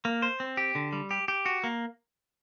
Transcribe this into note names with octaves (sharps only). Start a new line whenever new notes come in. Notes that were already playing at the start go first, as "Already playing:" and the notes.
A#3
C5
C4
G4
D3
G3
G4
G4
F#4
A#3